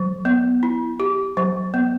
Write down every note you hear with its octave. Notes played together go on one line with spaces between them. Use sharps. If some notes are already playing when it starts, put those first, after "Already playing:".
Already playing: F#3
B3
E4
G4
F#3
B3